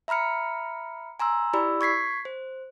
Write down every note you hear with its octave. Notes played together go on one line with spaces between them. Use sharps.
E5 A#5 B5 F6 C#7
G#5 A#5 C6 E6
E4 G4 D5 B5 E6
C#6 G#6 B6 C7
C5